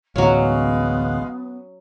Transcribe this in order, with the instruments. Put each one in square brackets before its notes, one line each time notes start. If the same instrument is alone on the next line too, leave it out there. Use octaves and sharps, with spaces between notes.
[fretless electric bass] A1 D2 [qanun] F#3 C#4 [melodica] G#3 F5 [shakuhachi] B3